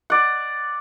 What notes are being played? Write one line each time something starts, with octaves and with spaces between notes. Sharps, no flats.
D5 F#5